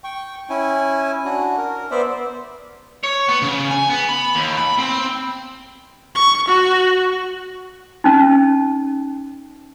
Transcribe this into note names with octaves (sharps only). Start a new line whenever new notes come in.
G5 C#6
C#4 E4 G#5
D4 F#4
A#4
B3 C5 D5 E5
C#5
B3
C#3
G#5
B3
B5
D#2
B5
C4
C#6
F#4
C#4 D#4